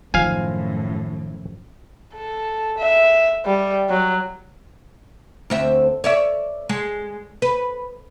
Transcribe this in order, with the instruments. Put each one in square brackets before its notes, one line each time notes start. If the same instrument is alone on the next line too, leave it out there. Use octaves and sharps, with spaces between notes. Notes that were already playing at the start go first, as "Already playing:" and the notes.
[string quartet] F#2 A2 [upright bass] D#3 D#4 [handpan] F3 [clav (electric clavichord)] F5 G#5
[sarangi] A4
E5
G3
F#3
[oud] D2 C4 E5
C#5 D5 E5
G#3
B4